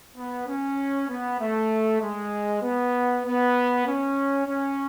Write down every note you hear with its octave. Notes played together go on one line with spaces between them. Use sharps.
B3
C#4
B3
A3
G#3
B3
B3
C#4
C#4